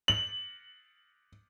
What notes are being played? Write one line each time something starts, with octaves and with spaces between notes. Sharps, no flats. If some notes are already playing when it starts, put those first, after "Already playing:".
F#7